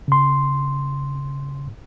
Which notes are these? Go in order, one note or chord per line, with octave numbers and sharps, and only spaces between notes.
C#3 C6